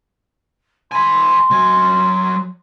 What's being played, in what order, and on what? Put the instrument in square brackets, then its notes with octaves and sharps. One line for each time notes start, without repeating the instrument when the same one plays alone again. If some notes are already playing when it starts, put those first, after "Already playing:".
[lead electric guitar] G#5 B5 [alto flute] C6
[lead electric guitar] F#3 G#5